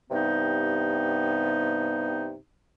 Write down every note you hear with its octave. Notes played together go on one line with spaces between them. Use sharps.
G2 C3 B3 D#4